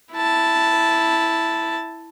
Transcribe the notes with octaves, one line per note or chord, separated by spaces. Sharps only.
E4 A5